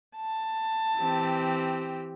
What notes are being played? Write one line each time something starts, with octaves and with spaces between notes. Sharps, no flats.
A5
E3 C4 G4